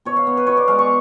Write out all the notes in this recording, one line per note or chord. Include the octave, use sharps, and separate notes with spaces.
B2 C#5
F5
B3
B4
B2 C#5
D5
G#3 F5
C#6